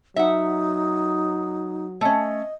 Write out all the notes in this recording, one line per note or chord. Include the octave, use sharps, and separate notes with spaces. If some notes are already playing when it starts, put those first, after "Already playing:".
F#3 D#4 E5 F#5
A3 C#4 D#5